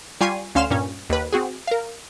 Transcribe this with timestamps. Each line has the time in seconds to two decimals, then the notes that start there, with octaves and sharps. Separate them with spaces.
0.21 G3 F4 G#5 C#6 C7 D#7
0.55 D2 C#4 F5 C6 F6 E7
0.70 G2 A#2 C#4
1.10 D#2 B4
1.33 C4 F#4 G#4
1.67 A#4 F5